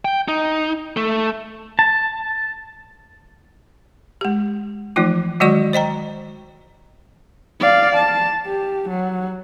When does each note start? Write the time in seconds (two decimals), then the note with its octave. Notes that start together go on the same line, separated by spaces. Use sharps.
0.05 G5
0.28 D#4
0.97 A3
1.79 A5
4.21 G#3 G4
4.96 E3 F3 A3 D#4 F4
5.40 D#3 F#3 G#3 F#4 D5 C#6
5.73 C5 D#5 G5 A#5
7.60 D5 F5
7.95 A5
8.46 G4
8.89 F#3